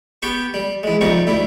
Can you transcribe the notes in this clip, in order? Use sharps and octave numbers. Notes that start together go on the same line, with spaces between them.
B3 G4 G5 C#6
G3
E3 G#3
F2 C3 G3 D#4 C#6
D2 G3 E4